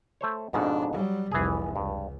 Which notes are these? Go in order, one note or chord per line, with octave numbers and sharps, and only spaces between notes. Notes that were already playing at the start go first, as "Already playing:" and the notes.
A3 C5 C#5
F2 G#2 B2 D4
F#3 G3
F1 C2 E3 G#4
C#2 G2